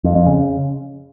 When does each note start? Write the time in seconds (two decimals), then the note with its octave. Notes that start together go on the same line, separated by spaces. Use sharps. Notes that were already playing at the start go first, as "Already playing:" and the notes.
0.04 F2
0.15 F2
0.26 C#3